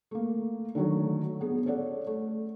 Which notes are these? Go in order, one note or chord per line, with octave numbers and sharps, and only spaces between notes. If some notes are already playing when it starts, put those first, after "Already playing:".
A3 A#3
D3 D#3 F#3 A3
B3 G#4
C#4 A4 D5 F#5
A3